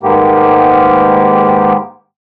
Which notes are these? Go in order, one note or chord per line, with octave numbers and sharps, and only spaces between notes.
G#2 D#3 G#3 A#3 B3 G4